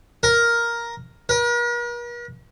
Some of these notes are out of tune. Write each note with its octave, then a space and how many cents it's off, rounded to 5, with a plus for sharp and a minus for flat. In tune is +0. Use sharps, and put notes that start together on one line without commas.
A#4 +5
A#4 +45